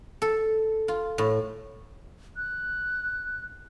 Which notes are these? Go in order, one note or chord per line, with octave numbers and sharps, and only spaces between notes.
A4
F4
A2
F#6